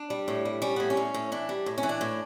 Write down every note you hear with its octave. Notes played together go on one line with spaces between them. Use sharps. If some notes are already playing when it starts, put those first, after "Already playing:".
Already playing: D4
G3
A2
G3
G3 C#4
A2 B3
C#4
A2
A2
E3 D4
G3
A2
C#4
E3
D4
A2